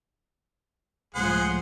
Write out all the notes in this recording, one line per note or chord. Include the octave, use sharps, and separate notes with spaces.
C#2 A2 F3 G#4 C5 F#5